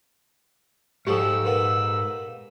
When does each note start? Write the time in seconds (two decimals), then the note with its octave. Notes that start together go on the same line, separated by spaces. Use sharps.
1.07 G#2 F3 G3 A3 G4 A4 E6
1.45 A#2 B3 A#4